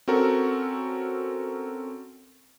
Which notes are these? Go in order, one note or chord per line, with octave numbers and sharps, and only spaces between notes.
C4 C#4 F#4 A4 A#4